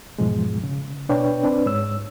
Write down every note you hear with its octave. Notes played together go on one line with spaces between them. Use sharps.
E2 G#2 B2 F3 G#3
C#3
B2 D4 B4 C#5 G5
C4 D4 B4
G#2 C#5 E6